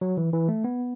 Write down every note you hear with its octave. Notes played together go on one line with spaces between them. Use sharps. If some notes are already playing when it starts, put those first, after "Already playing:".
F#3
E3
E3
A3
B3